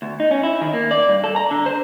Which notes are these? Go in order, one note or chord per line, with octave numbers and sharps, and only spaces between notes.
D2
D#4
C#4
E4
D#3
A#3
D5
G2
A4
A#5
D3
C5